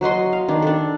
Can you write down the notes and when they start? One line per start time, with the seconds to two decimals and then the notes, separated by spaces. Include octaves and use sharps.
0.01 F#3 F#4 D#5 C6
0.33 F5
0.48 D#3 D4
0.62 D4 A4